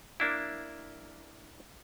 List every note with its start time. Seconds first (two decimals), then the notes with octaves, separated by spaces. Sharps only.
0.20 A#3 D4 E4